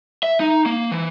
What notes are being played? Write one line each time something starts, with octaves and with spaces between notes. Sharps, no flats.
E5
D#4
A#3
E3